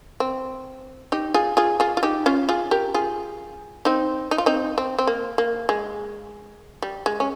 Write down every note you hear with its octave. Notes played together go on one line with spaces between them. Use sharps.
C4
D#4 G4
F4 G#4
F4 G#4
F4 G#4
F4
D#4 G4
C#4 F4
F4 G#4
G4 A#4
F4 G#4
C4 D#4
D#4
F4
C4 D#4
C4
C4
A#3
A#3
G#3
G3
G#3
C#4